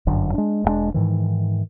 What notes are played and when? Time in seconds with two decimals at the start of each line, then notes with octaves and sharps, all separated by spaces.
0.07 G1 F#2 D3
0.34 G#3 D4
0.64 E1 G2 G#3 D4
0.94 G#2 D#3 E3